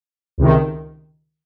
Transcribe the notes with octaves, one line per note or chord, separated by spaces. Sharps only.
C#2 C3 D#3